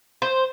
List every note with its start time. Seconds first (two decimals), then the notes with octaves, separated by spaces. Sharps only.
0.22 C5